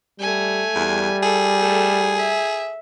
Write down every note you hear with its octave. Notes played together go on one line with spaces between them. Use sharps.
G3 A3 G#5
E2 G3
G#4 A4
A3 A4
E5